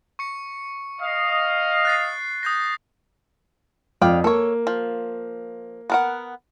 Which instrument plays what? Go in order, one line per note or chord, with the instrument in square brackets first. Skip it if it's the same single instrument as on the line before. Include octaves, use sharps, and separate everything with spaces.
[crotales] C#6 C#7
[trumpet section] D#5 F5
[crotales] F#6 A6 C7
D#6 G6 A#6
[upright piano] F2 [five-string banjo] D5 F5 G5
[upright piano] A#3 [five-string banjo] A4 C#5
[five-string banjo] F3
B3 A#4 F#5